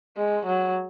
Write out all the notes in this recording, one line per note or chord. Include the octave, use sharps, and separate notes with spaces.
G#3
F#3